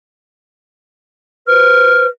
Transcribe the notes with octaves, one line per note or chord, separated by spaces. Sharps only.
B4 C5 F6